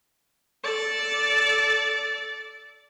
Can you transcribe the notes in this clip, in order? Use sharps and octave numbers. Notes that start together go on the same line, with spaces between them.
A4 D5